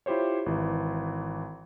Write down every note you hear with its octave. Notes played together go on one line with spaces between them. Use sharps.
E4 F4 G4 C5 C#5
G#1 E3